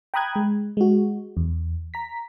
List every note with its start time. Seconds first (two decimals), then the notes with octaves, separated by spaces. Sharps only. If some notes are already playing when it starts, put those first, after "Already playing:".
0.14 G5 A#5 B5 D#6 F#6 G#6
0.36 G#3
0.77 G#3 F#4
1.37 E2
1.94 A#5 B6